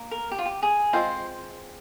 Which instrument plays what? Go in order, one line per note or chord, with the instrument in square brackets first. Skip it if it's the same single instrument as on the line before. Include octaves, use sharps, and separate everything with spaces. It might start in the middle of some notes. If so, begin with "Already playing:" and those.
Already playing: [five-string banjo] A#3
[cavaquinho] A#4
G4
F4
G4
G#4
[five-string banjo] G#3 C4 F4 [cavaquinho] C5